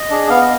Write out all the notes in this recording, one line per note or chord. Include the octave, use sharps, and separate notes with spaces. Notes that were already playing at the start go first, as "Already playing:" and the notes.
Already playing: D#5
D4 G#4
B3 F5
D#5